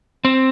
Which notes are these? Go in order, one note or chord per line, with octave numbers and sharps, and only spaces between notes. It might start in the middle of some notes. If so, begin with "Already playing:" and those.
C4